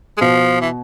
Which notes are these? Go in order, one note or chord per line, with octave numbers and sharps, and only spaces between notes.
G#3
B2 F3
E3